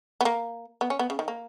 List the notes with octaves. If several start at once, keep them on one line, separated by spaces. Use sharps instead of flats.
B3
A#3
B3
C#4
B3
C#3
D#3
A#3